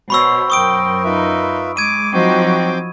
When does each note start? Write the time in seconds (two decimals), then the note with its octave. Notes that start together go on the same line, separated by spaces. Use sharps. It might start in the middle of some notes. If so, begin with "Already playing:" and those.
0.10 B2 C5 C#5 B5 C#6 E6
0.50 F#2 A#4 G5 C#6 D#6 D7
1.04 D#4 F4 B4 E5
1.77 G#3 D6 G#6 D#7
2.13 F3 F#3 C4 D#4 F#4 G5 D6